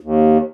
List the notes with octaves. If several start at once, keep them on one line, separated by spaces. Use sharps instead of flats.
D#2